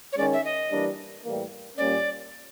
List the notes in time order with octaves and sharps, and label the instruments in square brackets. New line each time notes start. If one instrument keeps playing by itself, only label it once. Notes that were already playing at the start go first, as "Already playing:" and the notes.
[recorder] C#5
[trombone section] D#3 G#3 C#4 [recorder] D5
[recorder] E5
D#5
[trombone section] E3 G3 A#3 D4
A2 E3 G3 A#3
[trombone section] A#2 G3 A#3 C#4 [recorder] D5